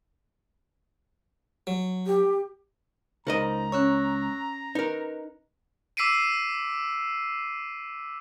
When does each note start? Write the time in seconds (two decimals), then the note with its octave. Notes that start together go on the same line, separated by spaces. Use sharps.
1.67 F#3
2.06 G4
3.27 C#2 D#4 A#4 C5 D#5 A#5
3.72 C#4 C#5 C#6 E6 F#6
4.75 D#4 A#4 B4
5.97 D6 E6 B6 C7 D7 D#7